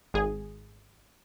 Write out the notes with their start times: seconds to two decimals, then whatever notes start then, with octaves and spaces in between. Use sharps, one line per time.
0.14 G#1 G#4